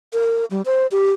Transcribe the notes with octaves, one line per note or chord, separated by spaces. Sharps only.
A#4
G3
C5
G4